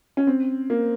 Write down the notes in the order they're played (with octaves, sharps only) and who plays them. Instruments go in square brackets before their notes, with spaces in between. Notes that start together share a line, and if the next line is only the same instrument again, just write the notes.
[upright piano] C#4
C4
A#3